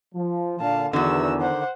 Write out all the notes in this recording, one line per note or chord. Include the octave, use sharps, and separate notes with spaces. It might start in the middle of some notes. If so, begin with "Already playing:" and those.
F3
A#2 D3 F5 A5
E2 D3 D#3 F#4 E6
C5 F#5